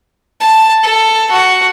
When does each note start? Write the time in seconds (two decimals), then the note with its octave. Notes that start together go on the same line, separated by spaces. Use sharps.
0.41 A5
0.83 A4
1.31 F#4